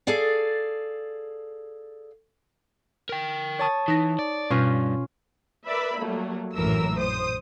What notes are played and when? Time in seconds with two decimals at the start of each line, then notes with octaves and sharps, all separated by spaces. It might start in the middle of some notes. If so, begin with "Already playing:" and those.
0.07 G#4 A4 D5 F5
3.09 A#4 G5
3.59 C#5 A5 D#6
3.88 E3 D#4 A#6
4.19 D5
4.51 G2 B2 C#4 F4
5.66 A#4 B4 D5 E5 B5
5.98 F#3 G3 A3 A#3
6.55 A#1 F#2 A2 E3 A#4 E6
6.98 C5 D#6